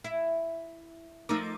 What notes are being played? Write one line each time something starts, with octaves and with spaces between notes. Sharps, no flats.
E4
F3 A3 D#4 A#4 D6